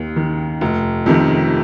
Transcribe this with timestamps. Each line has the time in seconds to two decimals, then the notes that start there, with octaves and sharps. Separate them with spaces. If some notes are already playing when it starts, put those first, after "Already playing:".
Already playing: D#2 D#3
0.16 D#3
0.61 F1
1.06 F2 C3 D#3